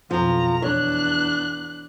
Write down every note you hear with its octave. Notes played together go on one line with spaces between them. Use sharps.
B1 F2 F3 A#5
E2 D4 C#5 F#6